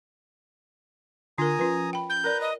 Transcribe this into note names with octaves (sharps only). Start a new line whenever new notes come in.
D3 F4 A#4 G#5 A#5 D#6
F3 C#4 F4 B4
G5 B5
G6
A#4 B4 D5 A#5
D#5